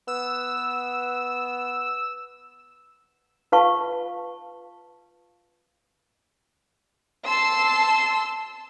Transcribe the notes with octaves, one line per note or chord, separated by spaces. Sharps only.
B3 E6
F4 B4 F5 A5 C#6
A5 C6 E6